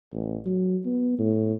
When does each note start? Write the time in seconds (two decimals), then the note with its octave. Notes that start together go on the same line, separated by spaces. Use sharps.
0.13 A1
0.46 F#3
0.86 B3
1.19 A2